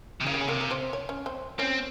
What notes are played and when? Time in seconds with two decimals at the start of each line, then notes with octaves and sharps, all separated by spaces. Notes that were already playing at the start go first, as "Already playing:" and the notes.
0.21 C3
0.26 C#3 A#3 A#4
0.34 G4
0.41 G#4
0.48 C3 A#3 A#4
0.61 A#4
0.71 C4 C5
0.93 C#5
1.09 C#4 C#5
1.26 C4 C5
1.59 C4 C#4 C#5